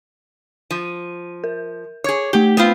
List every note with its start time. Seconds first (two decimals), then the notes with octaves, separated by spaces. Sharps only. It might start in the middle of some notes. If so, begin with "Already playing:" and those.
0.71 F3 D#7
1.44 A#4
2.04 G#4 C#5 D6 G#6
2.33 A3 G4 G7
2.57 B3 C4 F4